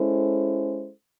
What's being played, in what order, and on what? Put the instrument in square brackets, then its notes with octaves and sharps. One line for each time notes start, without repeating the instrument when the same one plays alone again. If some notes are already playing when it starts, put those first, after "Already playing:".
Already playing: [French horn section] G#3 C#4 E4 A4 C5